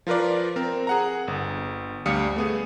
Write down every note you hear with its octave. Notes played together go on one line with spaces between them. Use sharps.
F3 F4 A#4 B4 D5
C4 A#4
G#4 F#5 A#5
G1
D2 G3 F5 D#6 C#7
A3 B3 G#4